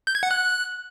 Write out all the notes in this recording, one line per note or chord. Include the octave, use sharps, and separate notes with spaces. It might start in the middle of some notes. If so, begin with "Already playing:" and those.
G6
G#6
F#5
F#6